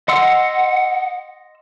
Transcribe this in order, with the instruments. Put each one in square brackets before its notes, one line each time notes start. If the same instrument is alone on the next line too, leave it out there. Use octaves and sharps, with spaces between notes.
[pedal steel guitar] D#5 C6 E6 [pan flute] F#5